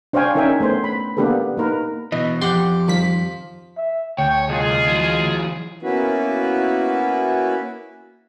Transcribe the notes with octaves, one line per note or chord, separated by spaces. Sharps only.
D4 C5 C#5 F5 G5 G#5
C#4 D#4 A#4 E5 G5 G#5
A3 B3 C5
B5
A#3 B3 D4 G4 A4 B4
A#3 D#4 A#4 B4
B2 E3 D#5
F2 G4 F#5 C6
D#3 F3 G3 B6
E5
D2 C#5 G5
C2 F4 G#4 D#5
E3 F#3
A#3 B3 C#4 E4 F#4 B4